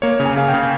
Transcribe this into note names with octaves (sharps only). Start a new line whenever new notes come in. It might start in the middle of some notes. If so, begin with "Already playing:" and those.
A#3 C#5
C#3
G#5
C#3 F5
G5
C#3